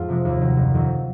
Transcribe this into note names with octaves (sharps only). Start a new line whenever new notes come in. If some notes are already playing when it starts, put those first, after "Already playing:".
Already playing: F2 G#2 F4
C3 F3 G#3
D#2
D#3 F#3
F#1
F2 D#3 F#3